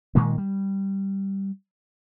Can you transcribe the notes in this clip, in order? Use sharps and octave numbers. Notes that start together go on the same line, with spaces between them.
A#2 D#3 G#3 A#3
G3